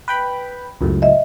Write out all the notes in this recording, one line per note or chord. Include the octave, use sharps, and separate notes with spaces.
B4 G5 B5
C#2 F#2 A2
D#5 E5